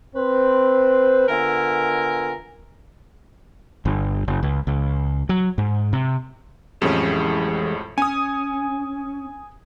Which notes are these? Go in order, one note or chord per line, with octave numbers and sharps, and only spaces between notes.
C4 B4 C5
D3 B3 F4 A#4 E5 G#5
G1
F#1
C#2
C#2
F#3
G#2
C3
F2 A2 E3 G#3 C#4 G4
C#4 G#5 D#6